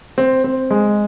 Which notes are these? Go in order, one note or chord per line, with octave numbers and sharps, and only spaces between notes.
C4
C4
G#3